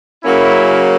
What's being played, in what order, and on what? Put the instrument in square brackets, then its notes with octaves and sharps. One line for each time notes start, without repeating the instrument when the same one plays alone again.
[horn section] F#2 C#3 F#3 A#3 C#4 E4